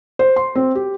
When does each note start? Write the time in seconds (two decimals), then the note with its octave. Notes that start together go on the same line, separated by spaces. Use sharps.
0.19 C5
0.36 C6
0.55 C4
0.75 G4